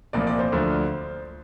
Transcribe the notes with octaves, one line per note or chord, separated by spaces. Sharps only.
C2 A#2 F3 D5
D5
C5
D2 D3 F3